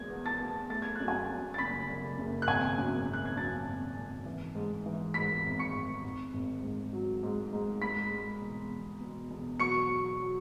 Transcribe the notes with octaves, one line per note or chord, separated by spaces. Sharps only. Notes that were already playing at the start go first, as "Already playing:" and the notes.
Already playing: E2 G#3 G#6
B3
A5 A6
B3
A3 A6
G#6
F#2 F#6
G#5 G#6
F#2
A6
F#1 B5 B6
F#1
F#1
F#6
G#1 G#5 G#6
F#2
G#1
F#6
G#6
F#2 A5 A6
G#1
G#1
E3
G#2
E3
G#2 B5 B6
G#1
C#6 C#7
G#1
G#1
G#1
G#2
F#3
G#2
G#2
G#3 B5 B6
G#3
E1
E1
B2
E1
F#3 C#6 C#7
F#3
F#3